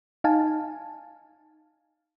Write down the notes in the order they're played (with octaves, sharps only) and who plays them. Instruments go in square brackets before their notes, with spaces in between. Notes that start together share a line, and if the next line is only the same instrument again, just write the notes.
[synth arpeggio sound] D#4 F5 G#5 A5